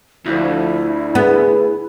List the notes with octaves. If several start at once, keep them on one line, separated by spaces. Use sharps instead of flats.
D2 D3 F3 E4
B3 G#4